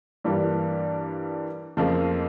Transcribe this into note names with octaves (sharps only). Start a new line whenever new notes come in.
G2 E3 G3 A#3
F2 C#3 F3 A#3